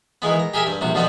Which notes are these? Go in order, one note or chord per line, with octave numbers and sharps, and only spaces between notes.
D#3 E3 G#3 B3
A#5
G4 G#4 A#4 E5 G#5
G2
A#1 C3 F#4
B2 D3 F3 G3 B3 C4